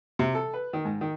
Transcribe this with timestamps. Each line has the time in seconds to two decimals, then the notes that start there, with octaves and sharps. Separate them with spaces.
0.19 C3
0.35 A4
0.54 B4
0.73 D#3
0.85 G#2
1.01 D#3